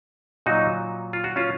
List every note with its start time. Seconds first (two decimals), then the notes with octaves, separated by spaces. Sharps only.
0.46 A#2 F#3 D#4 F#4
1.13 F4
1.24 F#4
1.36 C#4 F4